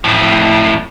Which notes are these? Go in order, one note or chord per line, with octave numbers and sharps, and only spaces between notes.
F2 A2